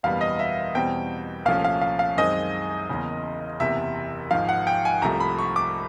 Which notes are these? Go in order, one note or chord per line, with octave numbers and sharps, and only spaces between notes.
F#1 E2 B2 G3 B3 F5
D#5
E5
E2 B2 G3 C4 G5
C2 A#2 F3 A3 C#4 F5
F5
F5
F5
F#2 D#3 G#3 C4 D#5
F#1 E2 C#3
F#1 E2 C3 E5
G#1 G#2 F3 F5
F#5
G5
G#5
C2 C3 F3 A3 A#5
B5
C#6
D6